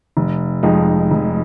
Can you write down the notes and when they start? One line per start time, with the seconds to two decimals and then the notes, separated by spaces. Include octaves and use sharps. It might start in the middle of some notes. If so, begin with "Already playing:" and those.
0.17 F1
0.63 F2 F3 G#3 D#4
1.11 F1